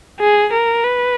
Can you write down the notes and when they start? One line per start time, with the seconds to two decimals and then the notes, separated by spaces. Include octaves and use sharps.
0.20 G#4
0.52 A#4
0.84 B4